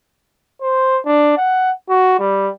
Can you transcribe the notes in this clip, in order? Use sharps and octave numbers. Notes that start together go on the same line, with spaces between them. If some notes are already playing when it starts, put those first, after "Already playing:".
C5
D4
F#5
F#4
G3